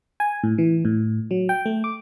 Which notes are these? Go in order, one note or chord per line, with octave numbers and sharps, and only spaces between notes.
G#5
A2
E3
A2
F#3
G5
A3
D6